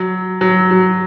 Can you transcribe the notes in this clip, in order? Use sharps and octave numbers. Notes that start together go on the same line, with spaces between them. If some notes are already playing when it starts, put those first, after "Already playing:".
Already playing: F#3
F#3
F#3